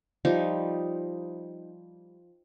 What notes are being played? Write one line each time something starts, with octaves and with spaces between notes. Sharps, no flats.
F3 G3 D#4